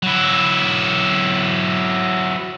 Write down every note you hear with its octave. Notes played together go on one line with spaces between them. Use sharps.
F#3 E4